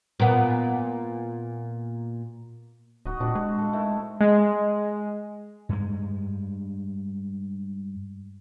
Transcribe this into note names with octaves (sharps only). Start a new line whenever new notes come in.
A#2 B3
D1 D#4 F#4 D#5
A#2 C4 D4 F#4
G#3
A4 F5
D#3 A3 E4
G#3
G2 G#3